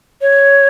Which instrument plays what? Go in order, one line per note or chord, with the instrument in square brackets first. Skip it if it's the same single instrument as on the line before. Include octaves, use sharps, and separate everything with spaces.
[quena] C#5